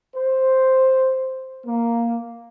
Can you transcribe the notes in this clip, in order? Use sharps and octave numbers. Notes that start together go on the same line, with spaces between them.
C5
A#3